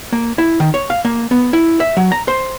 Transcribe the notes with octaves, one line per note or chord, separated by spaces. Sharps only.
A#3
E4
D#3
C#5
F5
A#3
B3
E4
E5
F#3
A#5
C5